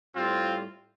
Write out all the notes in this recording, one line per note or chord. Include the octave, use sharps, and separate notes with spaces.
A2 G3 C4 F4